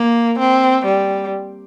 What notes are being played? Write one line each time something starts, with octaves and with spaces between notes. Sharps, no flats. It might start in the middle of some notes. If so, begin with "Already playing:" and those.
Already playing: A#3
C4
G3